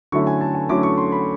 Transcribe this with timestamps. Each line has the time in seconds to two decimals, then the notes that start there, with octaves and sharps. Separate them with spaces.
0.12 D3 F#3 A3 C#4 E4 C#6
0.27 G#5
0.41 A5
0.55 G#5
0.69 D3 F#3 A3 C#4 E4 D6
0.83 C#6
0.98 C6
1.12 B5